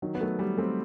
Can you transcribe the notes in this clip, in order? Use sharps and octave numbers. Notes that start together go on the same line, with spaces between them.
D#3 F#3
B3
F#3 A3
G3 B3
A3 C4